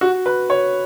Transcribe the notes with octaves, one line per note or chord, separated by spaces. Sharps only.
F#4
B4
C#5